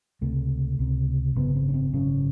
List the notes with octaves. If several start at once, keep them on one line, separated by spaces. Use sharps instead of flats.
C#2 C3 A3
C#2 C3
G#1 F#2 C#3 B3
C4
C#4
C4
G#1 F#2 C#3 C#4